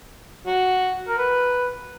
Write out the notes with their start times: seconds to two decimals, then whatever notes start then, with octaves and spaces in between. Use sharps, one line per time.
0.46 F#4
1.08 A#4
1.18 B4